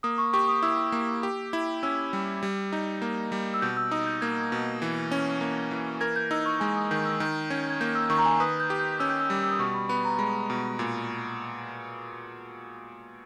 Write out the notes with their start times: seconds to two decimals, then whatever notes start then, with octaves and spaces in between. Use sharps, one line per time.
0.03 A#3 D#6
0.18 C#6
0.33 G4 C#6
0.48 D#6
0.62 E4 E6
0.92 A#3
1.23 G4
1.53 E4
1.83 C#4 E6
2.13 G3
2.43 G3
2.73 D#4
3.02 A#3
3.32 G3
3.54 E6
3.62 B2 G6
3.77 E6
3.91 D#4 D#6
4.06 G6
4.21 A#3 G#6
4.40 G#6
4.52 B2
4.82 E3
5.11 C#4
5.41 A#3
5.71 E3
6.01 A#4 G#6
6.16 G6
6.31 D#4 E6
6.46 C#6
6.60 G#3 G#5
6.75 D#6
6.91 D#3 G6
7.05 E6
7.20 D#3 G6
7.50 C#4 G#6
7.70 G#6
7.80 A#3 G6
7.95 E6
8.10 D#3 C#6
8.18 A#5
8.25 G#5
8.40 B4 D#6
8.60 G6
8.70 G4
8.79 G6
9.00 C#4 E6
9.10 G6
9.20 E6
9.30 G3
9.43 E6
9.51 D#6
9.59 B2 C#6
9.74 B5
9.89 B3 B5
10.04 A#5
10.19 G#3 B5
10.50 B2
10.79 A#2